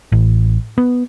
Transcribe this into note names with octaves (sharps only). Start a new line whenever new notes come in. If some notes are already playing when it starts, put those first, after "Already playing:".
A1
B3